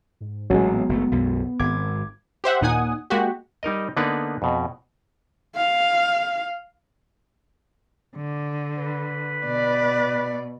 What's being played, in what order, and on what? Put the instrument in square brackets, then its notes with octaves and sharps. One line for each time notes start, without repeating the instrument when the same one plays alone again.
[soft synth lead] G#2
[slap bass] A1 A#2 [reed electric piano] F#3 G#3 [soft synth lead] C#4
[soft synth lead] B3
[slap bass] F#1 B2 A3
B1 F#2 B2
[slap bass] G#1 [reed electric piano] D6 G#6
[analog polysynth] G4 C5 E5 F#5
D#2 A#2 D#4 F#5 G#5 D#6
G#3 A#3 F#4 G4
[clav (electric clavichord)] G3 D#4 A#4 D#5
D3 A#3 B3 D#4 B4 D5
F2 B2
[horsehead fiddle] F5
[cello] D3
[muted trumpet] B4
[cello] B2 [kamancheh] D5